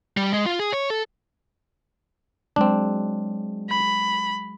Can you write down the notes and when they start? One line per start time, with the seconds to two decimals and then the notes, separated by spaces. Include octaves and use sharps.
0.17 G3
0.33 G#3
0.46 F4
0.59 G#4
0.73 C#5
0.90 A4
2.56 F#3 G#3 C4 D4
3.69 B5